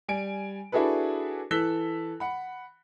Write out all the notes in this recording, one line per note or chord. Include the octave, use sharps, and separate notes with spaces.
G3 G#5 D7
D4 E4 F#4 G#4 A4 B4
E3 A4 E6 F#6 B6 G7
F#5 B5